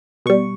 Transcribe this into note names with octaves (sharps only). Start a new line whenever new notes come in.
B2 G3 C#6